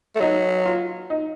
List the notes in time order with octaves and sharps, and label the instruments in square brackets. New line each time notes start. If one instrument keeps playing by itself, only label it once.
[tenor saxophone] A3
[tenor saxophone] F#3 [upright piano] D#4
[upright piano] F4
D#4